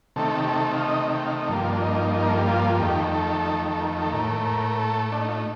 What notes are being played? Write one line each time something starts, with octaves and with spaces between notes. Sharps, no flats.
C3 D#3 A3 A4
G4
A4
F5
D#5
G5
F5
D#5
G2 F3 A#3 A4
G4
F4
D4
D#4
A#4
A4
G4
F4
F2 D#3 A3 G4
A4
A4
A#4
A4
A2 A3 A#4
A#4
A#4
A4
D4
D#4
F4
D#4